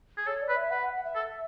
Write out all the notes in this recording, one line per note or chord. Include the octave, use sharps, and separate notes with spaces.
G#4
A4 C#5
D5
B4
E5
B4 F#5
F#5
F#5
E5
A4